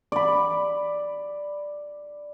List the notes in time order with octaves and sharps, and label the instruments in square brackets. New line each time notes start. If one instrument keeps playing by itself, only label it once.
[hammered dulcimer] D5 B5